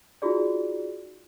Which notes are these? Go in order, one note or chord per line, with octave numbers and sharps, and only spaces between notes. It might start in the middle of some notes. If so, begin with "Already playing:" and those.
D#4 F4 F#4 G#4 D5